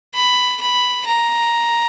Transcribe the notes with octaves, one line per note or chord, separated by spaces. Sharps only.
B5
B5
A#5